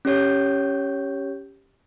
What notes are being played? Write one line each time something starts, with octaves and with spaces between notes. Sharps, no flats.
C#4 G4 C#5 G6